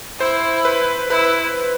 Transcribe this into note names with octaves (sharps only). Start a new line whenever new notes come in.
E4 C5
B4
E4 B4